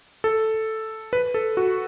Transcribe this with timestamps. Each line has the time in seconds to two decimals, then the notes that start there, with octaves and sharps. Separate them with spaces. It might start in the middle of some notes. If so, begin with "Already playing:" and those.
0.24 A4
1.13 B4
1.34 A4
1.57 F#4